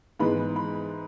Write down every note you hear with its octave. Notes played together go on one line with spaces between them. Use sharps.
G#2 E3 G#3 B3 B5
B5